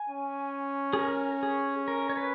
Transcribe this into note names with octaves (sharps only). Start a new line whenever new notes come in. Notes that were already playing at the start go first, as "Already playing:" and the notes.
Already playing: G#5
C#4
G#4
A#4
G#4
A#4
C#5
B4